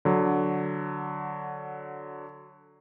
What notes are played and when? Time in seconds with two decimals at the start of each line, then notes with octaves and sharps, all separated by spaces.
0.05 D3 F#3